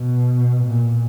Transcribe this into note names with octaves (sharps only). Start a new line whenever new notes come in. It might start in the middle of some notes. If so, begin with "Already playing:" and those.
Already playing: B2
A#2